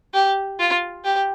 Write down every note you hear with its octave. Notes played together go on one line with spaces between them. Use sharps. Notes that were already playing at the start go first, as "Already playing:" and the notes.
G4
F4
G4